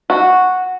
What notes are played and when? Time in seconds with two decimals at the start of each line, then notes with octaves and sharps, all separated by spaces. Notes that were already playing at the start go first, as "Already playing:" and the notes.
0.10 F#4